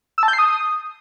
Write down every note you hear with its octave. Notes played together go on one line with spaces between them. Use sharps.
E6
A5
G6
C7
D#6